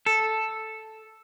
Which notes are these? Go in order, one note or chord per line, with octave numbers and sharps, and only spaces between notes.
A4